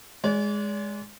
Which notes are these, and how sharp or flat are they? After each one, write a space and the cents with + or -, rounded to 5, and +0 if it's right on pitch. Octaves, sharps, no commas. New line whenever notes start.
G#3 +0 D5 -40